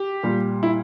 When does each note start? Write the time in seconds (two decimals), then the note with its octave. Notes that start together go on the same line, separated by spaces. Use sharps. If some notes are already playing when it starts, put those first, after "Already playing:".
Already playing: G4
0.23 A#2 G3
0.63 E4